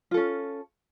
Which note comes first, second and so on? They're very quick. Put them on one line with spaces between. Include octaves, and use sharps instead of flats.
F4 A4 C#4